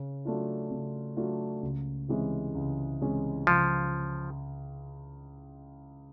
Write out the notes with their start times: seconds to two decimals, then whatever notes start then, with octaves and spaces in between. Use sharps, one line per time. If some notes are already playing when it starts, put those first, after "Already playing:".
Already playing: C#3
0.25 F#3 A3 D4 F4
0.71 C#3
1.17 F#3 A3 D4 F4
1.62 C#2
2.08 C3 E3 G#3 C#4
2.55 C#2
3.01 C3 E3 G#3 C#4
3.47 C#2 F3